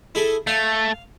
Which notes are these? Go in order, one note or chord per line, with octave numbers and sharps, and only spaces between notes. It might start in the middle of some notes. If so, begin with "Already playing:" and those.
E4 G#4 A4
A3 F5